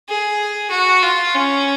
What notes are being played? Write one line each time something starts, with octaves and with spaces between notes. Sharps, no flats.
G#4
F#4
F4
C#4